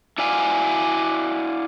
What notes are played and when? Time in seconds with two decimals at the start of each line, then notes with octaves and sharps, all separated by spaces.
0.18 E4 F#4 D5 F5 G#5